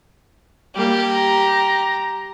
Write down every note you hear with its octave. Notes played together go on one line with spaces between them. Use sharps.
G3 A#3 G4
A#5